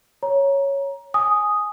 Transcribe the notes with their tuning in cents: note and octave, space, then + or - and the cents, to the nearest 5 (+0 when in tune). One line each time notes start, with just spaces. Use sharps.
C#5 +0 A#5 +15
G#5 +0 D#6 +0